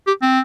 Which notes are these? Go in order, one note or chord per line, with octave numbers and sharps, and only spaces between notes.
G4
C4